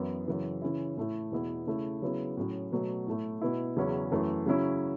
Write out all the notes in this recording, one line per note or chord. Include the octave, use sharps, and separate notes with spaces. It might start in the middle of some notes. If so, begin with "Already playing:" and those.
Already playing: F#2 E3 B3 E4
F#2 C#3 E3
C#3 E3 C#4 E4
A2 A3 E4
E2 B2 B3 E4
C#3 A3 E4
C#3 F#3 B3 E4
A2 F#3 C#4 E4
B2 F#3 A3
A2 A3 E4
B2 B3 E4
E2 C#3 F#3 C#4 E4
F#2 E3 A3
C#3 F#3 C#4 E4